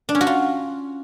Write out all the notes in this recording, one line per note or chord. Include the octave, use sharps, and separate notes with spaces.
D4
C#4
F#4
F4